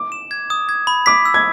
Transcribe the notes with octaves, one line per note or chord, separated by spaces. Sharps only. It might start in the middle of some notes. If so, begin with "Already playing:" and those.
Already playing: D6
E7
G#6
D#6
G#6
B5
D6 B6
E6
G#6